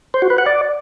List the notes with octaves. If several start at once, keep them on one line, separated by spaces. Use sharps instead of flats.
C5
F#4
B4
F#5
D5